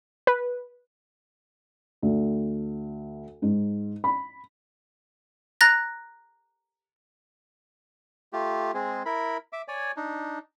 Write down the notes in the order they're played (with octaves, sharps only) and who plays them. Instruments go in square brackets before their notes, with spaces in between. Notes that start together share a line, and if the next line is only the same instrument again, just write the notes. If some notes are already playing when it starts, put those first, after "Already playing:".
[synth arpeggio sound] B4
[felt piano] D2
G#2
B5
[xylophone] A#5 F#6 A6 A#6
[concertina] A3 F4 G4
G#3 C4 G#4
E4 A#4 B5
E5 D6
C#5 D5 G#5
D4 D#4